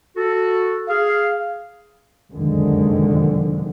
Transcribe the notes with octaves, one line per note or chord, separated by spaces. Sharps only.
F#4 A4
G#4 F5
F#1 C2 F2 D3 D#3 G#3